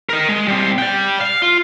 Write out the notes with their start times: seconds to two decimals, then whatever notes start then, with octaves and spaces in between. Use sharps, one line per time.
0.09 A#4 D#5
0.29 G#3
0.48 G3 C4
0.78 D5 G5
1.20 F5
1.42 F4